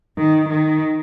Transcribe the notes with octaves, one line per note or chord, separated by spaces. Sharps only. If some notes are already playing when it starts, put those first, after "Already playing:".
D#3
D#3